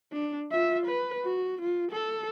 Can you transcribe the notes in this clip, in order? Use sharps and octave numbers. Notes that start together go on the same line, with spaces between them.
D4
F4 E5
B4
F#4
F4
A4